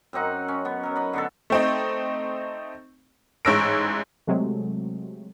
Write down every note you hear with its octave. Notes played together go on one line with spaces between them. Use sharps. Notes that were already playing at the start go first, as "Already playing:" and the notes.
F#2 C4 D#4 F#5
C#4
B3
F#3 A#4
B4 D#5
D3 B3 A4
A3 C4 D#4
A1 G#2 C#5 E6 A#6 D7
C3 F#3 G#3 A3